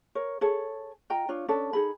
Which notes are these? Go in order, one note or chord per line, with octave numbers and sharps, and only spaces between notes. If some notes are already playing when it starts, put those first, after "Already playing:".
A#4 C#5
G#4 A4 C#5
F4 D#5 G5 A#5
D4 F4 C#5
C#4 D4 A4
D#4 G#4 B5